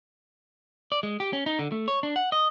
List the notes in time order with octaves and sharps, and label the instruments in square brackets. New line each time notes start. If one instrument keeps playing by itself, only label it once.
[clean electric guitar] D5
G#3
G4
C#4
D#4
D3
A3
C#5
D4
F#5
D#5